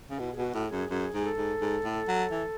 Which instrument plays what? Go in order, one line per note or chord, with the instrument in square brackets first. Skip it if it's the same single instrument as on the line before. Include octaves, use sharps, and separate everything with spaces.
[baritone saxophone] C#3
[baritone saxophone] B2 [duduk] E4
[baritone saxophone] B2 [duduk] G#4
[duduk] F#4
[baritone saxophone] A2
[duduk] G#4
[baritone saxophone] F#2
[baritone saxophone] F#2 [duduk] G#4
[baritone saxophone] G#2
[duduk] A4
[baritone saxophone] G#2
G#2
A2
F#3
E3